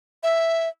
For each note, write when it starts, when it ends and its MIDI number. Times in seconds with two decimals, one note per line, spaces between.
0.23 0.68 76